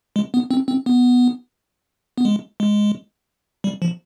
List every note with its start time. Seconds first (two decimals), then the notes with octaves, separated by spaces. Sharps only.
0.16 G#3
0.34 B3
0.51 C4
0.68 C4
0.86 B3
2.18 B3
2.25 G#3
2.60 G#3
3.64 G3
3.82 F3